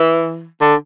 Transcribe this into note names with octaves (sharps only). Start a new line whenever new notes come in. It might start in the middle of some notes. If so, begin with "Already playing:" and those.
Already playing: E3
D3